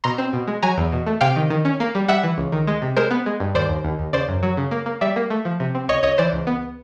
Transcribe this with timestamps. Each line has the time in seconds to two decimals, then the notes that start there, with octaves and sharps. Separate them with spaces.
0.04 B2 A#5 C6
0.18 C4
0.33 B2
0.48 G#3
0.63 F#3 G#5 A#5
0.78 E2
0.92 B2
1.07 A3
1.21 C3 F5 G5
1.36 D#3
1.50 D#3
1.65 C#4
1.80 A#3
1.95 G3
2.08 G3 E5 F#5
2.23 E3
2.38 C#2
2.52 D#3
2.67 G#3
2.82 C3
2.97 G#3 A#4 C5
3.11 B3
3.26 G#3
3.40 G2
3.55 D#2 C5 D5
3.69 D#2
3.84 D#2
3.99 D#2
4.13 C#3 C5 D5
4.29 F#2
4.43 F#3
4.57 C#3
4.71 A#3
4.86 A#3
5.01 G3 D5 E5
5.16 A#3
5.30 A3
5.45 F3
5.60 C3
5.75 C4
5.88 C#2 C#5 D#5
6.03 C#2 C#5 D#5
6.18 E3 C5 D5
6.33 C#2
6.47 B3